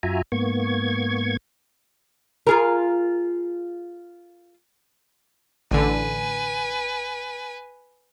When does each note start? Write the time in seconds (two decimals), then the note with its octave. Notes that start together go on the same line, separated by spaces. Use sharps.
0.03 F#2 F4 F#4 E5 G#5 A#5
0.32 G#2 A#3 B3 C#6 G#6
2.47 F4 G#4 A#4
5.71 A1 D3 B4 G#5